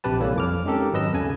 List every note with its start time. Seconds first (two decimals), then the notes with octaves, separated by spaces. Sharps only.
0.04 A#1 C3 G4 B4 A5
0.20 E3 G3 A#3 A4 C#5
0.36 F2 D6 F6
0.65 G#3 C#4 D#4 G4 A4 A#4
0.93 G#1 F#3 B4 D#5 E6
1.13 E2 C#3 A4 G#5